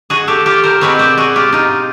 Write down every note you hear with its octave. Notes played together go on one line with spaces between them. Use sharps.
F#4 G#4
G4 A4
F4 G4
A#4 C5
B2 G#3 C4 B4 C#5
C5 D5
F#4 G#4
F4 G4
D#4 F4